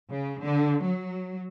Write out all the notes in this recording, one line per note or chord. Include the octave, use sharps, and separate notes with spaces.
C#3
D3
F#3